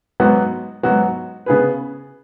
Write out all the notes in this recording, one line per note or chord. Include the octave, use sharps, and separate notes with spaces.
G#2 F#3 B3 F#4
G#2 F#3 B3 F#4
C#3 B3 G#4 B4